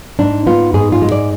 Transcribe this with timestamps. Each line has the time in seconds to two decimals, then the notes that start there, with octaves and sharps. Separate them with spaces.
0.19 G#2 D4
0.47 B3 F4
0.74 G#2 G#4
0.92 F4
1.02 G#3
1.12 D5